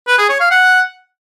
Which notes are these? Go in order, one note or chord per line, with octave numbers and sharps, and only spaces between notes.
B4
G#4
C#5
F5
F#5